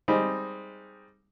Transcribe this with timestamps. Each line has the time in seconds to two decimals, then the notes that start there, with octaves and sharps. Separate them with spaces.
0.08 G3 G#3 C4 D#4 G#4